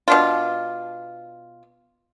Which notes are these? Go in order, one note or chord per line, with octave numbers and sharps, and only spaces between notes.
B2 D4 F4